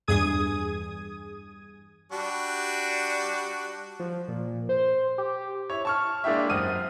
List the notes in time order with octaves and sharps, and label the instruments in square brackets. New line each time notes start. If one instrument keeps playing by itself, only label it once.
[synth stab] E2 G2 G#4 D#6 G#6 D#7
[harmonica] G3 D4 F#4
[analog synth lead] F3
A#2
C5
G4
[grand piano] E4 C#5
A5 C#6 F6
G#3 A#3 D4 E4 G4 E5
F#2 C4 F#5 D#6 F6 D#7